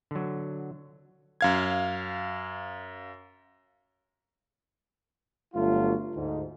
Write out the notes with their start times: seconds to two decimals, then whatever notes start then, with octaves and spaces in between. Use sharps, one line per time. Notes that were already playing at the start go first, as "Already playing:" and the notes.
0.11 D3 F#3
1.41 F#2 F5 G#6
5.54 G1 F#3 A3 F4
6.15 D2 G#2